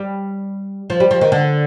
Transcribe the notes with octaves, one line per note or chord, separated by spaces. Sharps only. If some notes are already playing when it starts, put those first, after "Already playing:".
Already playing: G3
F3
G3
F3
D#3
D3